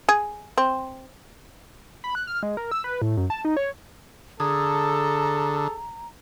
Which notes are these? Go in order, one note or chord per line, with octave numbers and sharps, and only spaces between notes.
G#4
C4
B5
F#6
F6
G#3
A#4
E6
B4
A2
F#2
A5
D#4
C#5
D3 G#4 A4 A#5 D#6